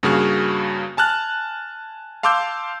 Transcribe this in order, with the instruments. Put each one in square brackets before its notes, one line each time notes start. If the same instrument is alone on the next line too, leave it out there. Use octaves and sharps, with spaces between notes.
[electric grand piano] G2 C#3 A#3 F#4 G#4 F6
G#5 A5 F6 F#6 A6
F5 A5 C6 D6 E6 G6